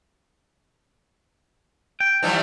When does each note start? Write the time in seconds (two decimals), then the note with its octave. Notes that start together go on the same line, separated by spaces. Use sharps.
2.00 G5
2.23 E3 F3 G3